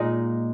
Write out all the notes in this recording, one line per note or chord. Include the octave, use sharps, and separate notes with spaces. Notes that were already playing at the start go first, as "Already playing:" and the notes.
Already playing: A#2 G#3 A#3 D#4